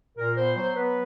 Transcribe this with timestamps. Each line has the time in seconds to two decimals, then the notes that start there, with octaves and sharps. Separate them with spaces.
0.17 A#2 A#4
0.36 B3 C5
0.55 F#3 C5
0.75 B3 B4